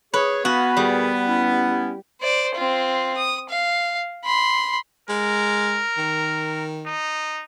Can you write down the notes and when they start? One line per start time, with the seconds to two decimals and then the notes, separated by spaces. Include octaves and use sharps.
0.14 G#4 B4 C#5
0.45 B3 F#4 F5 G#5 B5
0.77 A#2 D#3 G3 G#4
1.26 C#4 E4
2.21 C5 D5
2.55 C4 F4
3.17 D#6
3.49 F5
4.25 B5 C6
5.09 G#3 A#4
5.97 D#3
6.86 D#4